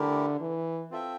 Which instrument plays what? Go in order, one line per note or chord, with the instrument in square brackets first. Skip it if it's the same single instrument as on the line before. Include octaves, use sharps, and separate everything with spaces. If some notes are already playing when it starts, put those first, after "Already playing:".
Already playing: [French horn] D3 [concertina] A3 E4 G4 A#4
[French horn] E3
[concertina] C4 F4 A4 E5 G5